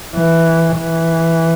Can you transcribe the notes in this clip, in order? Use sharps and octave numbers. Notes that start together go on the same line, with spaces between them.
E3
E3